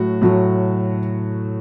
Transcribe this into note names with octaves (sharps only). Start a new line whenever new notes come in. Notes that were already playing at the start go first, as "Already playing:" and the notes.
Already playing: A2 F#3 A3 F#4
A2 F#3 A3